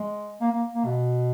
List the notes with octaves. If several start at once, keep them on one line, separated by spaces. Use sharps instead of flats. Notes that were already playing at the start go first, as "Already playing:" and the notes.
Already playing: G#3
A#3
A#3
A#3
B2